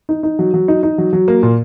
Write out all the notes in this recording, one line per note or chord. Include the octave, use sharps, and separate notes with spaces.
D#4
D#4
F#3
F#3
D#4
D#4
F#3
F#3
A#3
A#2